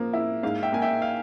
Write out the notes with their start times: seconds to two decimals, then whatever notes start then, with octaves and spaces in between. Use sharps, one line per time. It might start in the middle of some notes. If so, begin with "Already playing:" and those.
Already playing: F3 A#3
0.13 E4
0.43 G#2 F5
0.63 E5 G5
0.72 A#3 G#5
0.82 E5 G5
1.02 F5